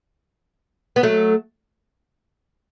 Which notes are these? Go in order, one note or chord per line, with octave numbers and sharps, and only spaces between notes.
B3
F#3 A3